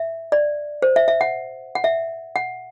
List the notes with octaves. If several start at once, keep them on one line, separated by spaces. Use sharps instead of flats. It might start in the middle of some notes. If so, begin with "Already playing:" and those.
Already playing: E5
D5
C5
E5
E5
F#5
F#5
E5
F#5